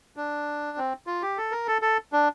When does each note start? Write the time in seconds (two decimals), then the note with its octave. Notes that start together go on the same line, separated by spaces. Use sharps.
0.17 D4
0.78 C4
1.07 F4
1.22 G4
1.38 A4
1.52 A#4
1.68 A4
1.82 A4
2.13 D4